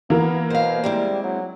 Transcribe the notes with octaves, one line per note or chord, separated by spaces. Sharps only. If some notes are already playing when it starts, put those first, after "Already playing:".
E3 A#3 B3 A#4
B2 C5 F5
G3 G#3 C4 E4
F#3